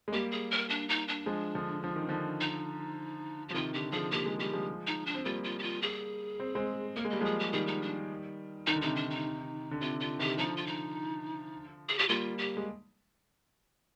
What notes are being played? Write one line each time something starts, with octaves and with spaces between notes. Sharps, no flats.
G#3
G3 A#3 G4
G#4
A#4
D4
D#4
D4
F3 G#3
D3 F3
F3
D#3
D3 F3
D#4
F3 G4
C3 D#3 F4
D3 G4
D3 F3 G#4
A#3 G4
G#3
G3 G4
F3 G#3
D#4
D4
C4
G3 A#3 F4
F4
G4
F4
G#4
C4
G#3 C4
A#3 A#4
G#3
G3 D#5
F3 G#3 G#4
G4
D#3 G3 G#4
D#4
D4
D#3 D#4
D3
C3 D#3 D#4
D4
D#4
D3
C3 F4
D3 F4
C3 D#3 G4
D3 F3 D#4
F4
D#4
G#4
G4
G3 A#3 F4
G4
G#3